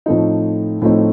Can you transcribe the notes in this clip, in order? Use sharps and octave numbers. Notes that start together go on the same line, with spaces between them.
A2 F3 A3 C4 D#4
A2 F3 A3 C4 D#4